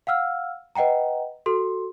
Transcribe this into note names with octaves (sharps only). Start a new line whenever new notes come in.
F5 F#5 E6 F6
B4 D#5 F#5 G5 A#5
F#4 A4 C6